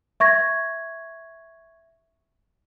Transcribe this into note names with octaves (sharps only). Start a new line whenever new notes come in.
E5 C#6 G#6 A#6